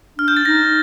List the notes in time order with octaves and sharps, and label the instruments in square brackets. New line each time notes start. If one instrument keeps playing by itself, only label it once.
[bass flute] D4 [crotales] F6
[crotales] G6
A6
[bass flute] D#4 [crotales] A#6